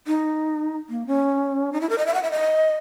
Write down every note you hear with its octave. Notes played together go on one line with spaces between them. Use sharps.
D#4
A#3
C#4
D#4
E4
A#4
D#5
E5
F#5
E5
D#5